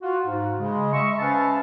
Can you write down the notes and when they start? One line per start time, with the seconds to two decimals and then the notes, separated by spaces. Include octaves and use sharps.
0.02 F4 F#4
0.26 G#2
0.59 C#3 G#3
0.93 D#5 E5 C#6
1.19 C#4 B4 C5 E5 F5 A5